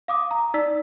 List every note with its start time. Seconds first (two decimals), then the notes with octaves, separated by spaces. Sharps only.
0.08 F5 D6 D#6
0.31 A#5
0.54 D#4 D5 E6 B6